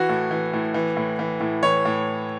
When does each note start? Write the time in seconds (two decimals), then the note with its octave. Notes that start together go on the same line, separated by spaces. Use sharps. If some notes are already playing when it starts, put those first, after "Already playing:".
Already playing: E3 F#4
0.09 A2
0.31 E3
0.53 A2
0.74 E3
0.97 A2
1.19 E3
1.41 A2
1.63 E3 C#5
1.85 A2